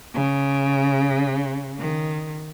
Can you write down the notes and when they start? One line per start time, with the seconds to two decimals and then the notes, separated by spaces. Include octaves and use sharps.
0.14 C#3
1.79 D#3